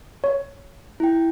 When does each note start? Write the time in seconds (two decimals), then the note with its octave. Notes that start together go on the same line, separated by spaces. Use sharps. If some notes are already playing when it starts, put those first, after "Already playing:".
0.24 C#5
1.00 E4 G5